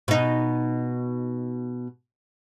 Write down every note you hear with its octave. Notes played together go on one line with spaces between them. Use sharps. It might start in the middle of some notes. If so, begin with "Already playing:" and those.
B2 D#4